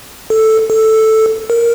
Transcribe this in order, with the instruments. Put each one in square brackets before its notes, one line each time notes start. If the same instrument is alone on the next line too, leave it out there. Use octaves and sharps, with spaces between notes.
[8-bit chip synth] A4
A4
A#4